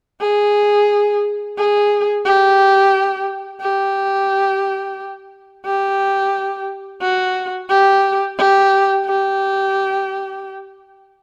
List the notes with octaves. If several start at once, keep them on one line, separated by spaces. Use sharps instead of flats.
G#4
G#4
G4
G4
G4
F#4
G4
G4
G4